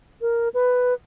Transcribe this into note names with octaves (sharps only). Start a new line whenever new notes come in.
A#4
B4